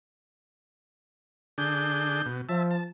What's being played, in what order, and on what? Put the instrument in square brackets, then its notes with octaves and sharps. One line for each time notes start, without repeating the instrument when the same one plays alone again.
[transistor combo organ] D3 D4 G#4 [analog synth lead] G6
[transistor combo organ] B2
[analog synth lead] F3 [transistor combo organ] E5 A5
[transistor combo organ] A5